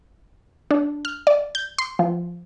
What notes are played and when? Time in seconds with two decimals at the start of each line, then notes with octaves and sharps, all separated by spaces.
0.71 D4
1.05 F6
1.27 D5
1.55 G6
1.78 C6
1.99 F3